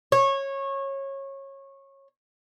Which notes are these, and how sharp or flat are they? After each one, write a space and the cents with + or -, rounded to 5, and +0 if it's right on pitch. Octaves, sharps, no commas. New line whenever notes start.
C#5 -20